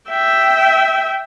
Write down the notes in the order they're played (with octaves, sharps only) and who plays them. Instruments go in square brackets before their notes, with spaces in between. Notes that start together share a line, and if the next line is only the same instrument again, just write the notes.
[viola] E5 G5